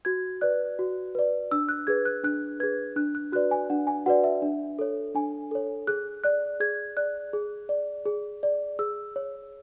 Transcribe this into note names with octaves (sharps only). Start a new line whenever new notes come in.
F#4 G#6
B4 D5 F#6
F#4
B4 D5
D4 E6
F#6
G#4 B4 G#6
F#6
D4 F#6
G#4 B4 G#6
D4 F#6
F#6
F#4 B4 D5 F#6
G#5
D4 F#5
G#5
F#4 B4 D5 F#5
E5
D4
A4 C#5
D4 G#5
A4 C#5
G#4 F#6
D5 F#6
G#4 G#6
D5 F#6
G#4
D5
G#4
D5
G#4 E6
C#5